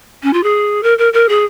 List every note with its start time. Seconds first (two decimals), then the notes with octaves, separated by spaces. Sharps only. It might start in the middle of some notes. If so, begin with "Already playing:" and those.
0.23 C#4
0.33 F4
0.43 G#4
0.83 A#4
0.98 A#4
1.13 A#4
1.29 G#4